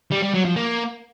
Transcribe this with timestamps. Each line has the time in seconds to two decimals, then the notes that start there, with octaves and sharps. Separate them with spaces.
0.11 G3
0.22 G3
0.34 F#3
0.45 F3
0.56 A#3